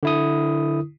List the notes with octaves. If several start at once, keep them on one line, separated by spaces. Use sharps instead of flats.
D3 E4 D#6